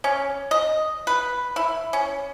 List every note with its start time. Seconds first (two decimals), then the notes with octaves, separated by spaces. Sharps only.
0.04 C#4
0.51 D#5
1.07 B4
1.56 E4
1.93 C#4